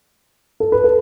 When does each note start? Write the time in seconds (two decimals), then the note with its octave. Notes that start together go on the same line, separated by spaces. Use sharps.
0.60 A4
0.72 B4
0.84 A4